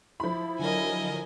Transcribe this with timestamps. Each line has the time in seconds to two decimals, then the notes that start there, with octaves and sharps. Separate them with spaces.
0.20 F3 E4 B5
0.59 D3 F#3 A#4 D#5 G#5